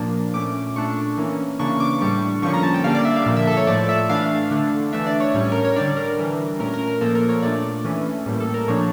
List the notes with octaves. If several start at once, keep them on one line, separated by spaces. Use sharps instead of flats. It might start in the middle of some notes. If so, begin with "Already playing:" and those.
Already playing: A#2 F3 A#3 D4
A#2 A3 C#4 D6
A#2 A3 D4 C#6
E3 A#3 C#4
C#3 E3 A#3 D4 C#6
D6
D6
A2 G3 D4 C#6
D3 F3 A#3 C#4 C#6
A#5
A5
G5
D3 G3 A#3 D4 F5
D5
E5
F5
A#2 F3 A#3
E5
A4
C#5
A2 F3 A3 D5
E5
E3 A3 D4 F5
D3 A3 D4
E3 A3 D4 E5
D5
C#5
A2 G3 C#4 C#5
A#4
C#5
D3 G3 D4 D5
A#4
E3 G3 D4
A#2 A3 C#4 A#4
A#4
A#4
A#2 F3 A#3 A4
A#4
C#5
A#2 A3 D4 D5
E3 A3 C#4
A2 G3 A#3
A4
A#4
A#2 F3 A#3 D4 C#5